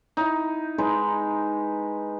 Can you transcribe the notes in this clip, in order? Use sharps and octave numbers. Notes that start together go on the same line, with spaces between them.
D#4 E4
G#3 D#4 B4